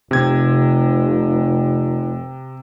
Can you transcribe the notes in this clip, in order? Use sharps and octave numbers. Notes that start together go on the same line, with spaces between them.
F1 C3 G#6